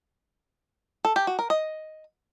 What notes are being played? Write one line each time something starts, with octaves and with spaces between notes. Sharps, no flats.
A4
G4
F#4
A#4
D#5